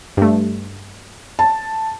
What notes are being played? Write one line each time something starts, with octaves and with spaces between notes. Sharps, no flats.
G2 A3
A5